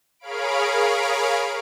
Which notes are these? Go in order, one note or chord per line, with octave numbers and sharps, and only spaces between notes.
G#4 A#4 C#5 F5 B5 D7